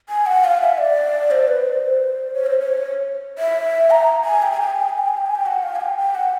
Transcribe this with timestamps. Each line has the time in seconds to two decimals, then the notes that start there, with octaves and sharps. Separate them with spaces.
0.09 G#5
0.26 F#5
0.44 F5
0.61 E5
0.78 D5
1.31 C5
1.48 B4
1.65 C5
2.34 C#5
2.46 C5
2.59 C#5
3.39 E5
3.91 A#5
4.25 G#5
4.42 G5
4.52 G#5
4.61 G5
4.71 G#5
4.80 G5
4.89 G#5
4.98 G5
5.08 G#5
5.17 G5
5.26 G#5
5.35 G5
5.46 F#5
5.63 F5
5.76 G#5
5.81 G5
5.98 G5
6.15 F#5